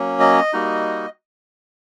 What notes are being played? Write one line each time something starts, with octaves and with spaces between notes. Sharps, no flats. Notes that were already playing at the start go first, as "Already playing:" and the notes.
Already playing: F#3 A#3 C#4
D#5
G3 A#3 D#4 F#4